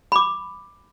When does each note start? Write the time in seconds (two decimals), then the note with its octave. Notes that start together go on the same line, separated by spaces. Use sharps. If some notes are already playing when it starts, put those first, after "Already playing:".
0.12 B5 D6